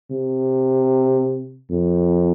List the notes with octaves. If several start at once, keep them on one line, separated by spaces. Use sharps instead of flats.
C3
F2